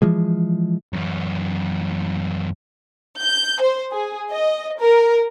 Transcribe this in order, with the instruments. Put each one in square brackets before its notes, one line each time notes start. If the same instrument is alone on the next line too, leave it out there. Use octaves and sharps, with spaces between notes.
[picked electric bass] E3 F3 G#3
[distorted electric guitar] F#2 E3
[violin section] G6
C5
G#4
D#5
A#4